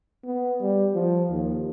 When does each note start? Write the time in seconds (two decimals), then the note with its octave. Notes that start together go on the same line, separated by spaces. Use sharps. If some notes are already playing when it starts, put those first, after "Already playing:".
0.25 B3
0.61 G3
0.94 F3
1.31 D#2